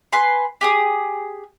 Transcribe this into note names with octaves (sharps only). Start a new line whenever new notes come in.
B4 G#5 C6
G4 G#4 D#6